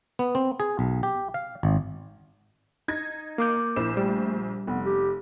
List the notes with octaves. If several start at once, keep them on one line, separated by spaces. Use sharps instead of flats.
B3
C4
G#4
B1
G4
F5
G#1
D#4 G#6 A#6
A#3 D6 G6
A#1 E4 C5 E7
G3 A3
F1 B3
G4